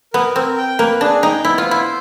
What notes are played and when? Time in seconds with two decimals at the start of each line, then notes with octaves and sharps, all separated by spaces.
0.13 B3 A#4
0.36 C4 A#4
0.58 G5
0.79 A#3 B4
1.01 D4 G#4
1.22 D#4 G5
1.45 B3 E4
1.58 F4
1.65 C5
1.71 E4